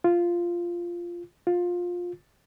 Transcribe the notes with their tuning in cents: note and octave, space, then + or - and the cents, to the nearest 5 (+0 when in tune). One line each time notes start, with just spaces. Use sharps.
F4 -10
F4 +15